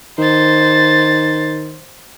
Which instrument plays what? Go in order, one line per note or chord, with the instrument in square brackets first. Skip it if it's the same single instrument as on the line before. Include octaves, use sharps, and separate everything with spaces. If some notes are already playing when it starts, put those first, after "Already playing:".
[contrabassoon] D#3 [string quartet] C5 A6